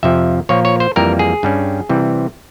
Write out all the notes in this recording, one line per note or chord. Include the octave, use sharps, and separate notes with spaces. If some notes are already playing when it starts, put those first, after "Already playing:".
F2 C3 F3 E5
A#2 F3 A#3 C#5
C#5
C5
F2 E3 G3 A#3 A#4
G#4
G2 G3 C#4
C3 E3 G3 C4